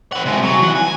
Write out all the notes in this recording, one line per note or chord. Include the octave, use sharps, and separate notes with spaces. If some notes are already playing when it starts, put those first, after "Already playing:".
C4 F#5
C3 G#3
F#3
E3 F#5
G#5